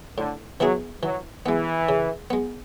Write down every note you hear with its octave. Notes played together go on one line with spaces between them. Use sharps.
A2 D3
E3 F#3 B3 E4 G#4
E3 F#3
E3 G#3 B3
C#3
G#3 B3